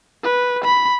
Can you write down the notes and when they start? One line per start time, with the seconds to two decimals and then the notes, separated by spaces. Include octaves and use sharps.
0.23 B4
0.64 B5